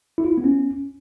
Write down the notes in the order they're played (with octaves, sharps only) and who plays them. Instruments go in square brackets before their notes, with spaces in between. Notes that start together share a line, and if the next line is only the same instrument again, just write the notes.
[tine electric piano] E4
F4
E4
B3
C#4